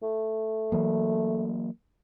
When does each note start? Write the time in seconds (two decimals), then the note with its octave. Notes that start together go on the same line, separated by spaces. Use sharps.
0.03 A3
0.72 E3 F#3 A#3